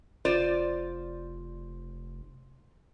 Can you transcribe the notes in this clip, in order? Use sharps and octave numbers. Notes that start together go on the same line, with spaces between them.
F1 F4 C5 D5